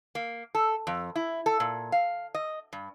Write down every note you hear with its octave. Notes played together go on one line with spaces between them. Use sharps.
A#3
A4
F2
E4
A4
A#2
F5
D#5
G2